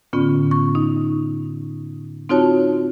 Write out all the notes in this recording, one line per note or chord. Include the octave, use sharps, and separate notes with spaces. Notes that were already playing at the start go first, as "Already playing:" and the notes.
A2 D3 B3 C#4 F4
C#6
D#4
C4 D#4 F4 F#4 C#5 A5